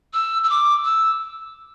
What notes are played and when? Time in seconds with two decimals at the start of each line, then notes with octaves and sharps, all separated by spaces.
0.14 E6
0.44 E6
0.50 D6
0.85 E6